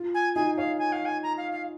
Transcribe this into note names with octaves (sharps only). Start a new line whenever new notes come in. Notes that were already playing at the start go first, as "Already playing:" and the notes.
Already playing: F4
G#5
D#4 G#4 G#5
G#4 C#5 F5
G#5
F5
G#5
A#5
F5
F5